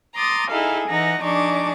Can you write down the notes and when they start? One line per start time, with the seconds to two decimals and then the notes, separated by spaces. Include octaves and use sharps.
0.15 A#5 C6 D6 D#6 A6
0.49 D#4 E4 G#4 A4 F5
0.88 E3 D#4 F#5 A#6
1.21 F3 D4 D#4 G#4 C#6 D6